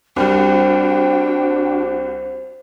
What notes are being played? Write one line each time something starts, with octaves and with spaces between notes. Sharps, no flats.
C2 G3 D4 F#4 C5 G5